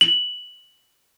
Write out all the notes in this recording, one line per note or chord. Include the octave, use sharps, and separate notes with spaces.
F#7